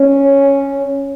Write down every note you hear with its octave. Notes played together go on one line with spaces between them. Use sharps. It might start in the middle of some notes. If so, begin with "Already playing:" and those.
Already playing: C#4